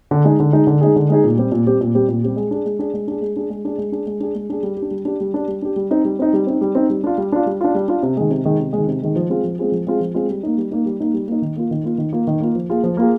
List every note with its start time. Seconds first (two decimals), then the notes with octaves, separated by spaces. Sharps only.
0.11 D3
0.25 G#3 D#4 G#4
0.40 D3
0.53 G#3 D#4 G#4
0.67 D3
0.81 G#3 D#4 G#4
0.96 D3
1.09 G#3 D#4 G#4
1.24 A#2
1.37 G3 C4 G4
1.52 A#2
1.66 G3 C4 G4
1.81 A#2
1.95 G3 C4 G4
2.08 A#2
2.23 G3 C4 G4
2.36 G#3
2.51 D4 G#4
2.66 G#3
2.79 D4 G#4
2.94 G#3
3.08 D4 G#4
3.21 G#3
3.36 D4 G#4
3.50 G#3
3.65 D4 G#4
3.78 G#3
3.92 D4 G#4
4.07 G#3
4.20 D4 G#4
4.35 G#3
4.50 D4 G#4
4.63 G3
4.77 G4
4.82 D4
4.91 G3
5.05 D4 G4
5.20 G3
5.34 D4 G4
5.48 G3
5.62 D4 G4
5.76 G3
5.91 C4 D#4
6.05 G3
6.19 C4 D#4
6.33 G3
6.47 C4 D#4
6.61 G3
6.75 C4 D#4
6.90 G3
7.04 D4 F4
7.18 G3
7.32 D4 F4
7.46 G3
7.61 D4 F4
7.74 G3
7.88 D4 F4
8.03 C3
8.17 D#3 G#3
8.30 C3
8.45 D#3 G#3
8.60 C3
8.73 G#3
8.78 D#3
8.88 C3
9.02 D#3 G#3
9.16 F3
9.29 G#3 C4 F4 G#4
9.44 F3
9.59 G#3 C4 F4 G#4
9.72 F3
9.87 G#3 C4 F4 G#4
10.00 F3
10.14 G#3 C4 F4 G#4
10.30 G3
10.43 A#3 D#4
10.57 G3
10.71 A#3 D#4
10.86 G3
11.00 A#3 D#4
11.14 G3
11.28 A#3 D#4
11.42 D#3
11.56 A#3 F4
11.71 D#3
11.84 A#3 F4
11.98 D#3
12.12 A#3 F4
12.27 D#3
12.40 A#3 F4
12.55 F3
12.70 A#3 F4 G#4
12.84 F3
12.97 A#3 F4 G#4